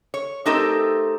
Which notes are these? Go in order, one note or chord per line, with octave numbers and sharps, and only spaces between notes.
C#5
A3 C4 D#4 G4 A4 A#4